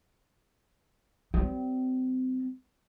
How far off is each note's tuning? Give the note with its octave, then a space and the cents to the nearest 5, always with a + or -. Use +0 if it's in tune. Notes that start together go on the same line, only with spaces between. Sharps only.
G3 -40 C4 -30